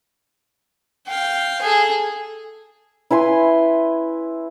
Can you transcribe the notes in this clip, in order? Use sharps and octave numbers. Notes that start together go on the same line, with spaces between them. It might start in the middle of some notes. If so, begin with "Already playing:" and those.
F5 G5
G#4 A4
E4 B4 G#5 C6